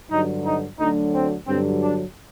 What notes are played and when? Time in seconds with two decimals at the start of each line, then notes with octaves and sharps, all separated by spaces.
0.11 G2 D3 F#3 D#4
0.45 D#4
0.79 D2 D3 F#3 D#4
1.14 C4
1.48 G2 D3 F#3 C4
1.82 D4